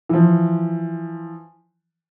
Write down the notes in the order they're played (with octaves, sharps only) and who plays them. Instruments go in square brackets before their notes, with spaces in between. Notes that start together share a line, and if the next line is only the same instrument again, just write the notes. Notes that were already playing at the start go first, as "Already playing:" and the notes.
[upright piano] E3 F3